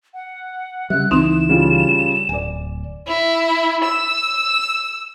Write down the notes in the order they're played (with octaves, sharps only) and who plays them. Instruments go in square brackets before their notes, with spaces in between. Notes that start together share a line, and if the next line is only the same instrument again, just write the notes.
[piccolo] F#5
[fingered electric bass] C#3 G3 [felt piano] E5 [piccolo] F#6
[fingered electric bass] C#2 E3 [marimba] C4 D#4 [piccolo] E7
[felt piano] C#3 G3 F4
[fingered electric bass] D1 [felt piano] D5 G#5
[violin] E4
E6